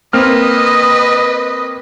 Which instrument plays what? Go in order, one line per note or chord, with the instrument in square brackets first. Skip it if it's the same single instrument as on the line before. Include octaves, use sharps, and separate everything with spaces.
[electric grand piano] A#3 C4 F6 [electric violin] B4 D#5